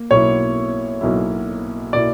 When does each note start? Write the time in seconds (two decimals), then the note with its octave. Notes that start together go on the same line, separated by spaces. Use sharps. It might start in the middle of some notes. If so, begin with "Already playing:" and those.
Already playing: A#3
0.10 B1 B2 A#3 E4 C#5
1.01 B1 B2 A#3 E4
1.93 B2 A#3 E4 D5